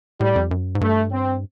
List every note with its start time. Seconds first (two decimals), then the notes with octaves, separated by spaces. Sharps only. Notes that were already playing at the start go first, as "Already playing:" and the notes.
0.20 A2 G3
0.36 F2
0.51 F#2
0.75 G#2
0.81 G2 A3
1.11 C4